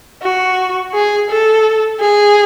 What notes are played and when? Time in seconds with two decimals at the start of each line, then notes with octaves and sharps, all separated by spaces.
0.23 F#4
0.94 G#4
1.30 A4
2.00 G#4